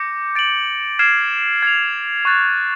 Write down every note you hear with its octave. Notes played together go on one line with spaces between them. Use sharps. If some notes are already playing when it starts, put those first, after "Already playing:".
Already playing: D6 G6 A#6 C#7
A6 D7 F#7
F6 G#6 C7 E7
G#6 C7 F7
C#6 F#6 A6